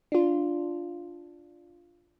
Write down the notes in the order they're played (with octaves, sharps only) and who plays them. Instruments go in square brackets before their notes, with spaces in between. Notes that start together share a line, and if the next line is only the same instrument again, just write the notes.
[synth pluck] D4 F4